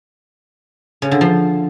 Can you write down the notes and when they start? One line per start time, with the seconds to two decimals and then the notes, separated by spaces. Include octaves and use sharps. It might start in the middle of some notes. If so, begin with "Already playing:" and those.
1.02 C#3
1.11 D3
1.21 F3